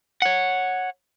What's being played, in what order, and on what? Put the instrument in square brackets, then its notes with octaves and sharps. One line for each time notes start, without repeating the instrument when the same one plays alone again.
[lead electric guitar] C#5 F#5